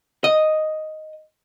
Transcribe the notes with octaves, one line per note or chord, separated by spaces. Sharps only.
D#5